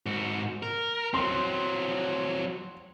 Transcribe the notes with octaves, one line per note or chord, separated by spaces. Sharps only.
G#2 F#4
A#4
F#3 C4 C6